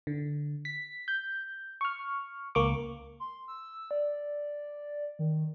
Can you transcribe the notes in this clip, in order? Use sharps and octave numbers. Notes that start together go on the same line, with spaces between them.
D3
B6
G6
C#6 F6
C#2 A#3 C#6 D6
C6
E6
D5
D#3